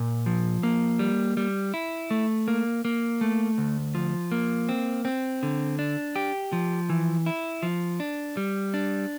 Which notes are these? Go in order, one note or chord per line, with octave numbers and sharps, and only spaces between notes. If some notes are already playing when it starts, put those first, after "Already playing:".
Already playing: A#2
F3
A#3
G3
G3
E4
A3
A#3
A#3
A3
D2
F3
A#3
C4
C4
D3
D4
G4
F3
E3
E4
F3
D4
G3
D4